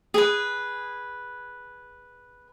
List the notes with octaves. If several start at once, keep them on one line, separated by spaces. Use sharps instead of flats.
G#4 B4